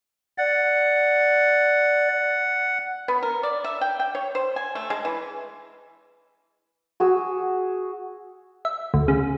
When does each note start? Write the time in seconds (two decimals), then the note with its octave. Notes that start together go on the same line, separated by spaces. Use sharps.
0.38 D5 F#5
3.08 B3
3.23 A#4
3.43 D5
3.64 E5
3.81 G5
4.00 G5
4.15 C#5
4.35 C5
4.56 G#5
4.75 A3
4.90 G#3
5.05 E3
7.00 F#4 G#4 E6
8.65 E5
8.94 D2
9.08 C#3